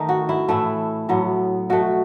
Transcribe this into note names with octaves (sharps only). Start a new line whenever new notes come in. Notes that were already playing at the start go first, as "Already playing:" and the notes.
Already playing: D#3 A3 D#4
F#4
E4
A2 E3 A3 E4
A2 F#3 B3
B2 A3 F#4